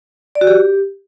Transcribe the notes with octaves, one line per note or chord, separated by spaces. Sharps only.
D5
F#4
G4